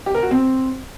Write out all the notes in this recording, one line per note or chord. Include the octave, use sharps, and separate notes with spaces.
G4
A#4
F#4
C4